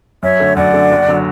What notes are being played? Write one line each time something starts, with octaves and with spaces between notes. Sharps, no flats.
F#2 C#5 E5
D3 A3
F#2 D5 F#5
D3 A3
F#1
D3 F#3